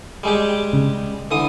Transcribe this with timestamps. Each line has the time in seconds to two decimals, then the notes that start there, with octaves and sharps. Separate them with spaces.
0.23 G3 G#3 G4
0.73 C#3
1.31 D3 E3 D#6